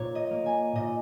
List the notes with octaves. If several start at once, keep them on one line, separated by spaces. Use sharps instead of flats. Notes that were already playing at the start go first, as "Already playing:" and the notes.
Already playing: A#2 A#3 F4 C#5
D#5
A#3
G#5
A#2 D#5